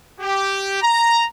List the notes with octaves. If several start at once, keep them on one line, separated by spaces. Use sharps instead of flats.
G4
A#5